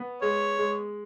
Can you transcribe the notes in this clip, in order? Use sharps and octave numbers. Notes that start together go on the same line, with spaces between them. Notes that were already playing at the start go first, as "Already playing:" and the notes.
Already playing: B3
G#3 C#5
G#3